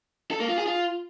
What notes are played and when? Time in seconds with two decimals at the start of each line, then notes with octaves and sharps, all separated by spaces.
0.31 A4
0.40 A#3
0.49 F4
0.58 G#4
0.66 F4